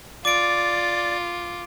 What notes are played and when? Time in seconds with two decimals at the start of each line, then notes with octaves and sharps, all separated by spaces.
0.25 F4 D5 D6 D7